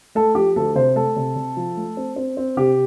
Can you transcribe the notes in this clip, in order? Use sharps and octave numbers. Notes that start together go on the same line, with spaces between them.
A3 A4
F3 G4
D2 A4
C3 C5
A3 A4
C3
C3
F3
A3
C4
C4
C4
C3 G4